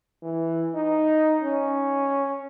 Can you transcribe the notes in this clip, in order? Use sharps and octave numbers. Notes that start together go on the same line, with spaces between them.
E3
D#4
C#4